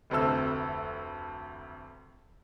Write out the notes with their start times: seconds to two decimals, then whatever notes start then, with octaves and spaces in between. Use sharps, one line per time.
0.10 F1 D2 C3 A4 E6